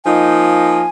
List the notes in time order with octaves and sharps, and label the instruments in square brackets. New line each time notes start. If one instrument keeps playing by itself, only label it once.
[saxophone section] F3 A#3 D#4 [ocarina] G#5